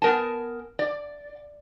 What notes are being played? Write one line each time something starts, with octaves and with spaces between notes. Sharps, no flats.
B3 A#4 G#5 A5
D5